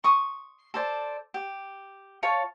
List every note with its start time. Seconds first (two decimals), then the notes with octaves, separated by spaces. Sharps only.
0.04 C6 C#6 D#6
0.74 A4 C5 D5
1.34 G4
2.23 F4 C#5 A5 C#6